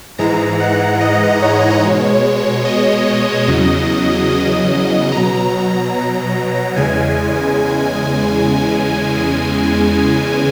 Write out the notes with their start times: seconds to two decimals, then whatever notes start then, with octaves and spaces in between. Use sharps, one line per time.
0.18 G#2 E3 G#3 A#5
0.60 F#5
1.01 D#5
1.42 C#5
1.83 B2 G#3
2.65 D#5
3.47 E2 C#3 F#3
4.29 D#5
5.12 B2 F#3 A#5
6.76 E2 C#3 G#3 G#5